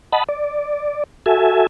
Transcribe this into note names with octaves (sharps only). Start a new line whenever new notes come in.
D#5 F#5 A5 B5
D5
F#4 A4 E5 G#5